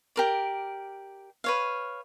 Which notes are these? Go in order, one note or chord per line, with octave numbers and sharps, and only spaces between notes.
G4 A#4 D5
B4 C#5 F5